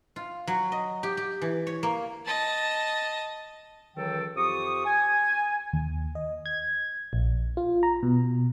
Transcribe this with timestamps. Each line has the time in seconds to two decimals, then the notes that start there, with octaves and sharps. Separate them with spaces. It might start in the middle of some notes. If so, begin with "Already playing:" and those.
0.16 F4
0.47 F#3
0.72 D#5
1.03 G4
1.17 G4
1.41 E3
1.67 C#5
1.83 A#3
2.26 D#5 A5
3.95 C#2 D#3 E3 F#3 A4 G5
4.36 F2 G4 C#6 D#6
4.85 G#5
5.73 D#2
6.15 D#5
6.46 G#6
7.13 A#1
7.57 F4
7.83 A#5
8.03 B2